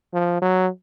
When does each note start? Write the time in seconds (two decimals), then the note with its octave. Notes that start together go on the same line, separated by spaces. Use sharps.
0.13 F3
0.42 F#3